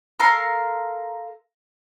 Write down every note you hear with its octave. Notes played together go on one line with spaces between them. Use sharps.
A4 A#4 F5 C6